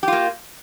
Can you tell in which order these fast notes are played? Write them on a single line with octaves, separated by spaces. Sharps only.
G4 F4 A#3